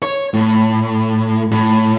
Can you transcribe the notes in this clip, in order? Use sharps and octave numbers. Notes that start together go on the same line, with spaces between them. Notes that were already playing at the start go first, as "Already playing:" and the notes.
C#5
A2
A2